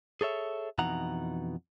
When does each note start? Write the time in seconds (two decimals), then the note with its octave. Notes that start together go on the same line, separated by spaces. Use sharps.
0.21 G#4 A4 C#5 E5
0.78 F2 B2 E3 D#4 F#5 A#5